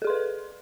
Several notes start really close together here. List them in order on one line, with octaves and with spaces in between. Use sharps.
A4 G#4 C6 B4